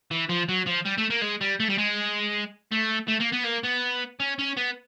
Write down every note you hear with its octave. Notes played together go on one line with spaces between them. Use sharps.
E3
F3
F#3
F3
G3
A3
A#3
G#3
G3
A3
G3
G#3
A3
A3
A#3
B3
A#3
B3
C#4
C#4
B3